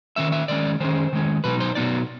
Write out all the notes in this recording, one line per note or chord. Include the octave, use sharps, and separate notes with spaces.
D#3 G#3 C#4 E5
E5
D#3 G#3 C#4 D5
D#3 G#3 C#4 C5
D#3 G#3 C#4
B2 F#3 B3 D#4 B4
C5
B2 F#3 B3 D#4 D5